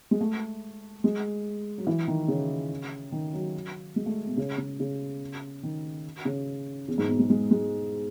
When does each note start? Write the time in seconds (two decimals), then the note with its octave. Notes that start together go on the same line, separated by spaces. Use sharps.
0.11 G#3
0.21 A3
1.04 G#3
1.78 F#3
1.87 E3
2.08 D#3
2.28 C#3
3.12 D#3
3.34 F#3
3.96 G#3
4.06 A3
4.27 B2
4.37 C#3
4.58 C#3
4.80 C#3
5.63 D#3
6.25 C#3
6.88 E2
6.98 G#2
7.09 B2
7.19 G#3
7.30 G#3
7.51 G#3